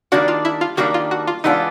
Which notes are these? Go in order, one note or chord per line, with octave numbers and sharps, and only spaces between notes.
D#3 G3 A#3 D4 F#4
F4
E4
F4
D#3 G3 A#3 D4 F#4
F4
F#4
F4
E3 G#3 B3 D4 D#4 F4